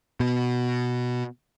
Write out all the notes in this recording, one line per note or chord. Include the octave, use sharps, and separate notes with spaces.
B2